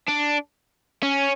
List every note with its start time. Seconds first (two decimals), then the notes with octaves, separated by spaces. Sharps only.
0.09 D4
1.03 C#4